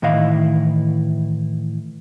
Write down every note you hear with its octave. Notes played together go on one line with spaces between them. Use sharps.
A2 D#3 E3 E4 D#5 F5